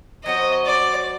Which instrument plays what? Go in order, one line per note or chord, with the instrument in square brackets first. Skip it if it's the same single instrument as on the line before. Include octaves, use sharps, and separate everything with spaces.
[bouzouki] F#3 C4 F#4 C5 [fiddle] D#5
[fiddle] D5